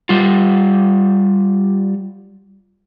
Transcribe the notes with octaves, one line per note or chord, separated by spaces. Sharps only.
G3 F4